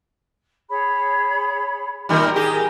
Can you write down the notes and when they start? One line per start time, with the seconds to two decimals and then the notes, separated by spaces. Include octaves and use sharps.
0.69 G#4 C#5 B5
2.09 A2 D#3 G3 A#4
2.36 G4 G#4